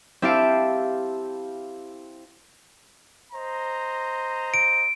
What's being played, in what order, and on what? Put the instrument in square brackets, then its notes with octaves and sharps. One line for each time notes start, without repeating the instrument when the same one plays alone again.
[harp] C4 E4 G4 F5 A5 D7
[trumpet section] C5 D#5 A#5
[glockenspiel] D7